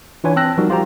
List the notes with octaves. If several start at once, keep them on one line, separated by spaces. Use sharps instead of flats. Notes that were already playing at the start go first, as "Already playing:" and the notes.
E3 D4 F4 B4 C#5 G#5
C4 G5 A5 E6 F#6 A#6
F3 G3 D#4 F#4 A#4
F4 G4 C5 G5 A#5